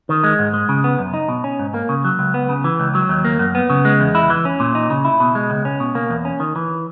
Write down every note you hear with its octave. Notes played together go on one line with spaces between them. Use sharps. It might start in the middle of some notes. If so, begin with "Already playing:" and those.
D#3
G#3
G#2
G#3
C#3
B3
F#2
D#4
B2
C#4
G#2
A#3
C#3
F#3
C#2
B3
C#3
E3
C#2
F#3
D#2
A#3
F#2
B3
C#3
G#3
E2
E4
E3
C#4
A#2
D#4
C#3
E4
B2
G#3
C#2
C#4
B2
A#3
E2
C#4
D#3
E3